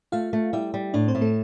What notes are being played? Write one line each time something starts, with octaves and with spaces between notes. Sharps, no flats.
A3 F4 F5
A3
G3 E4 E5
G3
A2 D4 D5
C4 C5
A2
A3 A4